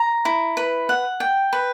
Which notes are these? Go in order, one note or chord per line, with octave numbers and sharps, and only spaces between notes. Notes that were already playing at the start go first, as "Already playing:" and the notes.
Already playing: A#5
E4
B4
F#5
G5
B4